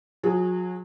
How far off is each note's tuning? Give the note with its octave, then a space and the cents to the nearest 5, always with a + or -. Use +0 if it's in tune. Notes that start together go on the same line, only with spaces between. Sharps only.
F#3 -35 G#4 +0